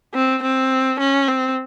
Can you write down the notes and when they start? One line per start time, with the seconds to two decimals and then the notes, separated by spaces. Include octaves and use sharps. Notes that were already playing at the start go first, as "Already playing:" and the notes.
0.14 C4
0.43 C4
1.00 C#4
1.28 C4